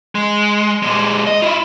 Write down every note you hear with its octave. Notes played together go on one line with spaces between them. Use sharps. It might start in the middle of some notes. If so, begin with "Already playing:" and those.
G#3
A#2 G#3
D#5
E4 F4